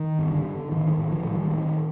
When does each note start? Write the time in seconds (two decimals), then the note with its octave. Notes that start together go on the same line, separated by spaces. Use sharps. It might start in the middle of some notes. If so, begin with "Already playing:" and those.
Already playing: D#3
0.19 G2
0.32 D3
0.45 D3
0.71 A2 D#3
0.91 D#3
0.98 A2
1.11 D3 F3
1.25 A2
1.31 D#3 G3
1.51 A2 D#3